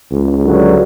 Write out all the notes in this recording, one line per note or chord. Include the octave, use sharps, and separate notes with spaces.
C#2
G2 D3 F#3